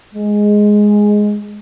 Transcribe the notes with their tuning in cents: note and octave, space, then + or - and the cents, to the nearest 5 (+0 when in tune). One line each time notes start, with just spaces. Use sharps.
G#3 +0